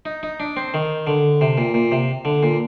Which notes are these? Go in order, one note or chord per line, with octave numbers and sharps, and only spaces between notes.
D#4
D#4
D4
C4
D#3
D3
C3
A#2
A#2
C3
D3
A#2